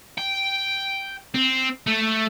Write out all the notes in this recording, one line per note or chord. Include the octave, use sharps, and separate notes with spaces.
G5
C4
A3